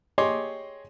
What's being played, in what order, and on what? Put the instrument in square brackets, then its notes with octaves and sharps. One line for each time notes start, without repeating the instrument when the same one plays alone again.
[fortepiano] G4 G#4 C#5 D#5 C6 D6